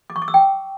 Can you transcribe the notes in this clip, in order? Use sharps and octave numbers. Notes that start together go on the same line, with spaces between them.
D6
C#6
D6
E6
G5